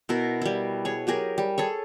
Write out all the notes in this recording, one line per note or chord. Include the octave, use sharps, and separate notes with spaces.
B2 E4 A#4
G3 E4
G#4 C#5
F#3 G4 G#4 A#4
G3
G#4 A4 C#5